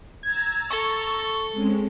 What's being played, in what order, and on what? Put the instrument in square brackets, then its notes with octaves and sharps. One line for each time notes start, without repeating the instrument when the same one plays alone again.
[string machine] A#5 E6 A6 [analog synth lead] G#6
[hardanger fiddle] A4 [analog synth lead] C#6
[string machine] G#3 C4 C#4